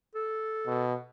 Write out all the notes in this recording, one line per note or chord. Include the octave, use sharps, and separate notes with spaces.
A4
B2